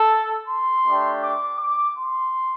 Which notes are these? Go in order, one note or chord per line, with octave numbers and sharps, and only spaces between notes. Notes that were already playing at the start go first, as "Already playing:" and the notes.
Already playing: A4
C6
A3 D4 G4
D6
D6
C6